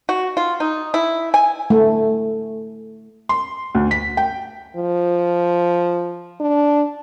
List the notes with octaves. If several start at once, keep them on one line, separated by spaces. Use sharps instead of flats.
F#4
F4
D#4
E4
G#5
A3
C6
D2
B6
G5
F3
D4